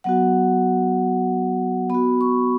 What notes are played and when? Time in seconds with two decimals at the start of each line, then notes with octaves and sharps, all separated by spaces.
0.04 F#3 B3 F#4 F#5
1.90 B3 F#4 B5
2.21 C#6